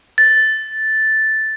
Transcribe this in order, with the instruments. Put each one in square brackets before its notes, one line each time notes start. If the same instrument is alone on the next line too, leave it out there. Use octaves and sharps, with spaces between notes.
[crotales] A6